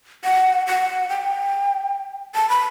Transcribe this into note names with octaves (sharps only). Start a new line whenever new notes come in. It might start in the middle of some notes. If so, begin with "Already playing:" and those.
F#5
F#5
G5
A5
B5